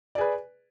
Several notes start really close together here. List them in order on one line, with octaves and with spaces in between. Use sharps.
D5 G#4 B4